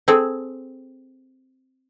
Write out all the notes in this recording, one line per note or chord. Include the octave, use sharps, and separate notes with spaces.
C4 G#4 A4